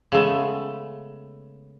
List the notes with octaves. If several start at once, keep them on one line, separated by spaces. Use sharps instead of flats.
C#3 G#3 A3 B3